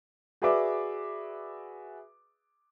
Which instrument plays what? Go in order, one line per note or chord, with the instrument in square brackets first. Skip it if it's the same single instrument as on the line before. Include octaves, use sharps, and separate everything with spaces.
[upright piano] F#4 G#4 B4 D5 E5 D6